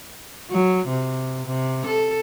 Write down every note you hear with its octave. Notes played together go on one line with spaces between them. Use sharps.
F#3
C3
C3
A4